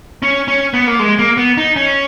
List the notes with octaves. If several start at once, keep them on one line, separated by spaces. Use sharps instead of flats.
C#4
C#4
B3
A#3
G#3
A#3
B3
D#4
C#4